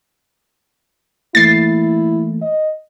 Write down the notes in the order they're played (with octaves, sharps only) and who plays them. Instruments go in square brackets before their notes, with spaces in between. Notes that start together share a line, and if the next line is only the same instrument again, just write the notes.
[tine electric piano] E3 A3 A#3 [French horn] E4 [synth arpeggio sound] A6 C7
[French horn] D#5